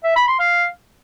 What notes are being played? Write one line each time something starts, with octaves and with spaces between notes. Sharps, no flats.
E5
B5
C6
F5